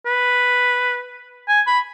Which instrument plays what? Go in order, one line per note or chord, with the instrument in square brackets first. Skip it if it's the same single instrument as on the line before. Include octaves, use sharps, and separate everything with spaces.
[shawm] B4
G#5
B5